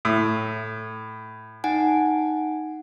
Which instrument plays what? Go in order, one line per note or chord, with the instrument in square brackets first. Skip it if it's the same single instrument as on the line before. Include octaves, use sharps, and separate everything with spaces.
[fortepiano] A2
[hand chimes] D#4 F#5 G#5